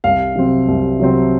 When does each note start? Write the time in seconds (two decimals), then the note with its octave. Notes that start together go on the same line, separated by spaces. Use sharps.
0.04 C2 F5
0.36 C3 F#3 C4
0.68 C2
1.00 C3 F#3 C4